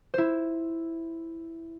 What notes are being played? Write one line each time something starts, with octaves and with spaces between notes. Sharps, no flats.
E4 C5